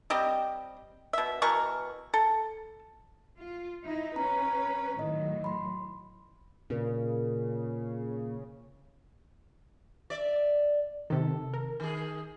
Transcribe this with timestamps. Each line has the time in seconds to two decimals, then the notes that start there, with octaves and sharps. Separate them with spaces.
0.10 G3 C4 G4 D#5
1.13 B2 E5
1.42 B2 E3 A#4 C#6
2.14 A4
3.38 F4
3.84 D#4 E4
4.16 C#4 B4 A#5
4.99 A2 D#3 F#3 D#5
5.44 B5 C6
6.70 A#2 C#3
10.10 D5 E5
11.10 C3 D#3 A4
11.54 A#4
11.80 D#3 G#4